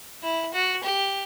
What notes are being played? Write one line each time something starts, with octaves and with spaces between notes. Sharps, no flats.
E4
F#4
G4